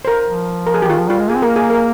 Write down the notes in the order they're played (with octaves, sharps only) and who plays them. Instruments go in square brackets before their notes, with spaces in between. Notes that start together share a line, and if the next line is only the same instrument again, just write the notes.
[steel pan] C5
A#4
[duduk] F3
[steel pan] A#4
G#4
[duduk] F3 [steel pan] G4
[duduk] D#3 [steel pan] F4
[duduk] F3
[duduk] G3 [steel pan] F4
[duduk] G#3
[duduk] A#3 [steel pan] G#4
[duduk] C4
[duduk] A#3 [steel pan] A#4
[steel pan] G#4
A#4